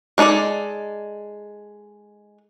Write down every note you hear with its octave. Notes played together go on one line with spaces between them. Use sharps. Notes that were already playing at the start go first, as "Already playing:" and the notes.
G#3 D4 D#4 A4 D5